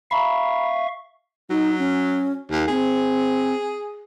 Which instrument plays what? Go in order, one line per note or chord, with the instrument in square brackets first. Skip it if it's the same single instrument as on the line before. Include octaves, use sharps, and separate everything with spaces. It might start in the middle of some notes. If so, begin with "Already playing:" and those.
[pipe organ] E5 F5 C#6 [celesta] A#5 B5
[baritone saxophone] F#3 [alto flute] D#4
[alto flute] C#4
[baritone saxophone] D#2
[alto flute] C4 [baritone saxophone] G#4